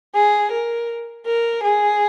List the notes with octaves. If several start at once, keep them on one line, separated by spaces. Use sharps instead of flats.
G#4
A#4
A#4
G#4